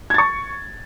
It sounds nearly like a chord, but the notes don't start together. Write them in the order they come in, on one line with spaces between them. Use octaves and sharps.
G#6 A6 C#6